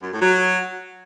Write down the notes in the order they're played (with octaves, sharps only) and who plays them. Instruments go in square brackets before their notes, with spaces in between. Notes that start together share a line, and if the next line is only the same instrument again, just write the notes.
[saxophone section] F#2
A2
F#3